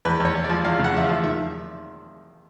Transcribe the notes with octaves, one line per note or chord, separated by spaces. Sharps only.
E2 B4
E2 C#5
E2
D5
F3
E2 F5
C#3 F#5
E2 E5
F5
F3
D#3 E5